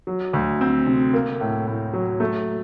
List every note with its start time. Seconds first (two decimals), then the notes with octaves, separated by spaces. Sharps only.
0.07 F#3
0.33 D2
0.61 C4
0.87 C3
1.14 A#3
1.41 A2
1.67 A2
1.93 F#3
2.20 A3